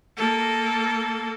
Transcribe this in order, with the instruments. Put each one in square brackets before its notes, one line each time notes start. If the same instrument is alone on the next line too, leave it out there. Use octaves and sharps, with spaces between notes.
[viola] A#3 A4